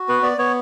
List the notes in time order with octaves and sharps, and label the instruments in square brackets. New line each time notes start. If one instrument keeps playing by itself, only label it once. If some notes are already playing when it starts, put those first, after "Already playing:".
Already playing: [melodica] F#4
B3 B4
B3 D5
B3 C#5